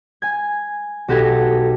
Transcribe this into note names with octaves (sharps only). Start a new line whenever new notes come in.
G#5 G#6
B1 F#4 G4 A4 G#6 A#6